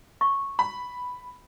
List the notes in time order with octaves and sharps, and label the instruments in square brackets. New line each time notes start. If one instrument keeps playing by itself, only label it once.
[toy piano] C#6
[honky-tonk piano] B5